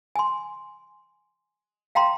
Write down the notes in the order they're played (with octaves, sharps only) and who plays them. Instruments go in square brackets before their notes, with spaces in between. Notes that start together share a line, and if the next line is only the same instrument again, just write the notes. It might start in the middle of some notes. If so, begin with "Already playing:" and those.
[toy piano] G#5 C6
F5 G5 A#5 C6